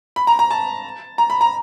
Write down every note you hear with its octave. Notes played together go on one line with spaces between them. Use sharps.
B5
A#5
A#5
A5
A#5
B5
A#5